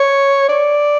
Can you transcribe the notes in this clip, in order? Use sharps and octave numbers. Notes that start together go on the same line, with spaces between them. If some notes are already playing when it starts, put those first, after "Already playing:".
Already playing: C#5
D5